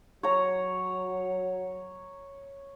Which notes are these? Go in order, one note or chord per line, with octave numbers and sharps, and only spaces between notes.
F#3 C#5 A#5